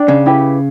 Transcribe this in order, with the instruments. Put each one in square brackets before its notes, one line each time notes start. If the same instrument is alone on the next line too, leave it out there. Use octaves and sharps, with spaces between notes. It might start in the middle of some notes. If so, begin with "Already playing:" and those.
Already playing: [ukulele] D4 D5 G5
[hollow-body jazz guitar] C#3
[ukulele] E4 G4 B4